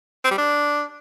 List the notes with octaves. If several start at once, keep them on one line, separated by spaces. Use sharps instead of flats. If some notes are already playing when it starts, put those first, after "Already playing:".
C4
G3
D4